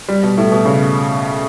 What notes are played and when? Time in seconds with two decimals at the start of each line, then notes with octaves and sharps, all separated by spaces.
0.08 G3
0.23 B2
0.38 A2
0.52 B2
0.65 C#3